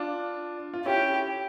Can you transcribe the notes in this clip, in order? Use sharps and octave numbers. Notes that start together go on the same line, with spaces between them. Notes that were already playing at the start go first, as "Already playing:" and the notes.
Already playing: D4 F4
F4
C#4 E4 G4